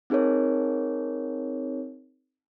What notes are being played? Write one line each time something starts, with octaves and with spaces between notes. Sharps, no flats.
C4 D#4 G#4 A#4 C#5